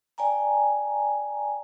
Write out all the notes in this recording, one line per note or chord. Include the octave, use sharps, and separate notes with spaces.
D5 G5 G#5 A#5